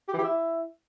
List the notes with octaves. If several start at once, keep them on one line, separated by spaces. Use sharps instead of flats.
G4
E3
G4
E4